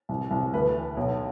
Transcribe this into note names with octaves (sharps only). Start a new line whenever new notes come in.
C2
C2
D2 B4
E3
B1